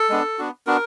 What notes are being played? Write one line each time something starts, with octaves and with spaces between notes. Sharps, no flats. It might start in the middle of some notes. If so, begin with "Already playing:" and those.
Already playing: A4
G#3 B3 D4
B3 D4 F#4
B3 D4 F#4 A#4